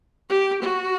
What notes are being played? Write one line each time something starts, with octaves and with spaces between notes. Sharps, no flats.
G4
F#4